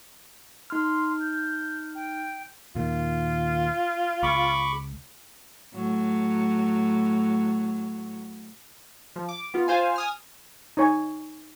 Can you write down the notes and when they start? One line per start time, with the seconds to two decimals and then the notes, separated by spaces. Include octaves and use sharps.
0.70 D#4 C6 F6
1.20 G6
1.94 G5
2.75 D#2 A#2 D#3 F4
4.23 C#2 B5 C#6 D6
5.75 A2 F#3
9.16 F3
9.29 D6
9.54 B3 F4
9.68 F4 C5 F5 G#5
9.96 G#5 D#6 F6
10.77 D#4 C#5 G#5